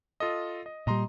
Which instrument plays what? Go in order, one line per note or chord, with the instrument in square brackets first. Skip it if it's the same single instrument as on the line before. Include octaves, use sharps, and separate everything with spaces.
[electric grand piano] F4 A4 D#5
D#5
[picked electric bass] A#2 G3 [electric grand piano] D#5 A#5 C6